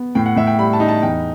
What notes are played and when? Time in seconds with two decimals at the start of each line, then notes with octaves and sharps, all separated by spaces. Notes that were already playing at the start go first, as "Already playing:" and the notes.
Already playing: B3
0.15 A2 G5
0.26 F#5
0.36 A2 E5
0.47 G5
0.59 G3 B5
0.73 A5
0.80 D#4
0.88 A5
1.02 E2 G5